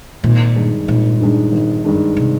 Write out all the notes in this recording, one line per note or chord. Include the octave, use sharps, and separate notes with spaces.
G#1 A#2
G2 D#3 G#3 D4
G#1 A#2
G2 D#3 G#3 D4
G#1
G2 D#3 G#3 D4
C3